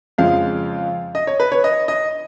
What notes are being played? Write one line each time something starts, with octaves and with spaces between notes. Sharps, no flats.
F2 C#3 F3 G#3 F5
D#5
C#5
B4
C#5
D#5
D#5